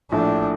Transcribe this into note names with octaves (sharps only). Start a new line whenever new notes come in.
A#1 A2 A3 D4